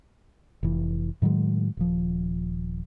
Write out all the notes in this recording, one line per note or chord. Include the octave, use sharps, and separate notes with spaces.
F1 E3
A2 D#3 F#3 G#3
D#1 F3